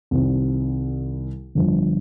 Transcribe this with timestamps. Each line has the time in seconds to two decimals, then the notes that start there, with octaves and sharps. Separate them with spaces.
0.11 C2 C3 D#3 G3 C4
1.55 G1 G2 F3